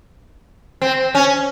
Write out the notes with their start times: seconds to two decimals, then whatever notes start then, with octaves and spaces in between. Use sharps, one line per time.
0.82 C4
1.15 C#4